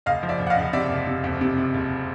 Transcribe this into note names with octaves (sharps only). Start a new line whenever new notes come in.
F#1 D#5 F5
F3
D5 E5
F#1
F#5
D#5 F5
F#1
C3 D5 E5
F#1
C3
F2
C3
C3
F#1